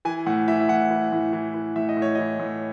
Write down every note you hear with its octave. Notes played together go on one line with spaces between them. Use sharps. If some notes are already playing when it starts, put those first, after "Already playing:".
E3 G#5
A2 F#5
E3 E5
E5
A2 F#5
E3
A2
E3
E3
A2 E5
D#5
A2
C#5
E3 D#5
A2